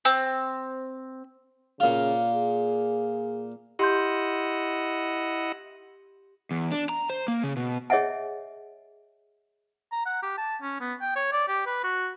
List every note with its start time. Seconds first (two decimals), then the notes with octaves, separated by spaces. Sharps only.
0.05 C4
1.80 A#2 C#3 F4
2.34 G#4
3.79 E4 G4 D#5 F#5 C6 G6
6.51 E2
6.72 D4
6.89 A#5
7.10 C5
7.28 A#3
7.43 C#3
7.57 B2
7.90 G#4 C#5 D#5 E5 F#5 G#5
9.92 A#5
10.06 F#5
10.23 G4
10.38 A5
10.62 C#4
10.81 B3
11.01 G5
11.16 C#5
11.32 D5
11.48 G4
11.66 B4
11.84 F#4